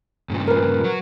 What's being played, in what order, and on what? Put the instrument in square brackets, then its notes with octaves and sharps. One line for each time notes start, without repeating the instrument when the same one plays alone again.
[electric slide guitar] G2 A#2 C#3
[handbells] A#4 B4
[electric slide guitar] F#3